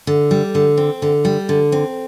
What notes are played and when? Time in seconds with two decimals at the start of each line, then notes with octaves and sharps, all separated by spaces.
0.07 D3
0.31 G3
0.55 D3
0.78 C4
1.02 D3
1.25 G3
1.49 D3
1.72 C4